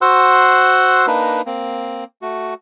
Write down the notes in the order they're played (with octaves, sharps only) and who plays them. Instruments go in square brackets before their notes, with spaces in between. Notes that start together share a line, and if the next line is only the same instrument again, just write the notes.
[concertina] F#4 C5 F#5 C6 E6 F#6
A#3 D4 D#4 B4
A#3 C4
A3 F#4